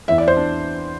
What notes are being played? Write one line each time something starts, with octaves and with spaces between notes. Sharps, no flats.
E2 E3 E5
D5
C5
D4